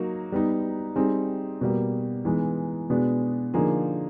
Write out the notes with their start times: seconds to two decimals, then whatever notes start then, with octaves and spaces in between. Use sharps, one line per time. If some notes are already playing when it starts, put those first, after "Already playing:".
Already playing: F#3 A#3 D#4 F#4
0.32 G3 B3 D#4
0.96 G3 C4 D#4 G#4
1.61 B2 G3 A#3
2.25 E3 G#3 B3 D#4
2.90 B2 G#3 B3 D4
3.54 D3 F3 A#3 D#4 G#4